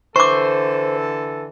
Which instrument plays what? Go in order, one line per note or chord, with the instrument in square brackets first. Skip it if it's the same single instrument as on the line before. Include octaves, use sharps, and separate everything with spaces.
[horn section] D3 E3 A4 [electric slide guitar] C5 [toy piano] C#6 D6